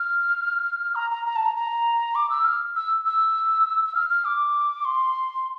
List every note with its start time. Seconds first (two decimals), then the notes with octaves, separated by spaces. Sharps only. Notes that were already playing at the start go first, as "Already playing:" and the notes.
Already playing: F6
0.95 A#5
1.10 A#5
1.26 A#5
1.36 A5
1.46 A#5
1.56 A#5
2.15 D6
2.30 E6
2.45 F6
2.76 E6
3.06 E6
3.86 E6
3.95 F6
4.10 F6
4.25 D6
4.85 C6